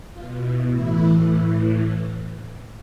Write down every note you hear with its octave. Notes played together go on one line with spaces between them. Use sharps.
B2 F4
E4
A2 E3 E4
A2 E3